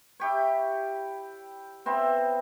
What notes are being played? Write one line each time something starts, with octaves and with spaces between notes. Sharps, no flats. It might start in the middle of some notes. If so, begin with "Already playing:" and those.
E4 G4 C#5
B3 C4 E4